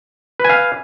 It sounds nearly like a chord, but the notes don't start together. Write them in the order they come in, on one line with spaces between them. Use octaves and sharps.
B4 G#5 F5